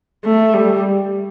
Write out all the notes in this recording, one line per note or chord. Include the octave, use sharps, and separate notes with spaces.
A3
G3